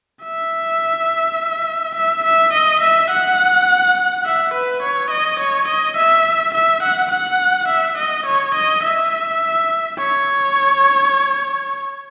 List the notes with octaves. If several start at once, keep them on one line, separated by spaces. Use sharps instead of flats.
E5
E5
E5
D#5
E5
F#5
E5
B4
C#5
D#5
C#5
D#5
E5
E5
F#5
F#5
E5
D#5
C#5
D#5
E5
C#5